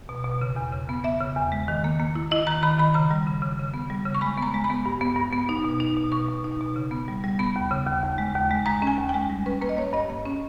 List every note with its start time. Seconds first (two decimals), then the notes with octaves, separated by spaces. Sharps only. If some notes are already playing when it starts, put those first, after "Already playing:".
0.09 B2
0.25 B2
0.41 C#3
0.56 E2
0.72 C#3
0.89 B3
1.04 B3 E5
1.21 C#3
1.37 E2
1.52 G#3
1.68 D#3
1.84 A#3
2.00 A#3
2.15 E4
2.31 E4 D#5
2.47 D#3 A#5
2.63 D#3 B5
2.79 D#3 B5
2.94 C#3 A#5
3.11 G3
3.27 C#3
3.42 C#3
3.59 C#3
3.74 B3
3.90 G3
4.05 C#3
4.15 C#6
4.21 G#3 B5
4.37 B3
4.42 A#5
4.54 G#3
4.64 B5
4.70 B3
4.86 G2
5.01 B3
5.16 G2
5.33 B3
5.49 D#4
5.64 B2
5.80 D#4
5.97 B2
6.12 B2 C#6
6.28 B2
6.44 D#4
6.61 B2
6.76 C#3
6.91 B3
7.08 G3
7.24 G3
7.39 B3 B5
7.56 D#2
7.71 C#3
7.86 D#2
8.03 D#2
8.18 G#3
8.35 D#2
8.51 G#3
8.66 G#3 A#5
8.82 C#4 G#5
8.98 D#2
9.09 G#3 G5
9.30 G3
9.46 C#4 B4
9.61 A#3 B4
9.69 D#5
9.77 A#3 C#5
9.93 G2 D#5
10.10 A#3
10.25 C#4